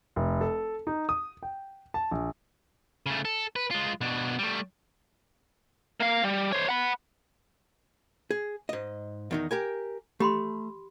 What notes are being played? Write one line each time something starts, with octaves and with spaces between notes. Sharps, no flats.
F1
A4
D#4
D#6
G5
A5
A#1
C#3 A3
A4
B4
G#3 F4
B2 D4
G3 A3
A#3 F5
G3
C5 C#5
F#5 B5
G#4
G#2 D#5
E2 D#3 D#4
G4 A#4 G#5
A3 G4 B5 C6